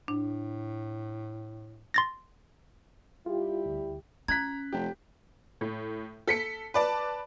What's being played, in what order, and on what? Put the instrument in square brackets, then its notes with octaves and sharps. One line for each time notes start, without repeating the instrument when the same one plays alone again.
[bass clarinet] A2 [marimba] D4
[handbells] C6 A6 A#6
[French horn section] G3 E4 G4 [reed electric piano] F4
[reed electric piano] D2
[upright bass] C#4 [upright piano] A#5 F#6 B6 [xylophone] G#6
[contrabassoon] F1 [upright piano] G4
[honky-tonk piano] A2
A4 B6 C#7
B4 D5 A5